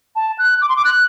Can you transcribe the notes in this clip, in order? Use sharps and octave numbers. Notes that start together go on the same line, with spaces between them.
A5
F#6
D6
C6
D6
F#6